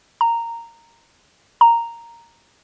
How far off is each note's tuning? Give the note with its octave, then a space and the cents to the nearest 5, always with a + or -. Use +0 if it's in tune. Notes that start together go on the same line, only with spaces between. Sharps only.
A#5 -10
A#5 -5